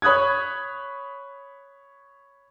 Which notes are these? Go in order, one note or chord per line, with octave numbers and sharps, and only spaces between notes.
C#5 B5 D#6 F#6 G#6